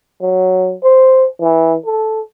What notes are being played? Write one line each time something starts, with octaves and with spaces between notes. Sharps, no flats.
F#3
C5
E3
A4